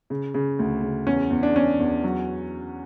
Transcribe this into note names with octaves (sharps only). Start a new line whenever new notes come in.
C#3
C#3
D2
C#3
E2 C#4
E2
D4
E2 C#4
E2
F#3